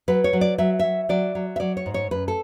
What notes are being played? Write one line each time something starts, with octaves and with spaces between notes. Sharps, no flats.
F#3 B4
C#5
F#3
D5
F#3 E5
F#3 E5
F#3 D5
F#3
E5
F#3 D5
C#5
G#2
C#5
F#2 B4
A4